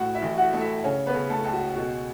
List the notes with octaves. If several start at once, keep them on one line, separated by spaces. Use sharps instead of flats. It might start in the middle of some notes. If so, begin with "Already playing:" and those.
Already playing: A2 F#4 F#5
E4 E5
A1
F#4 F#5
A3
E4 E5
C#3 C#4 C#5
B3 B4
C#3
A3 A4
C#2 A4
F#4
B2 F#4